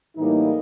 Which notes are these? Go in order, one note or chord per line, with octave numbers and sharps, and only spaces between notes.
A2 E3 G3 A#3 D#4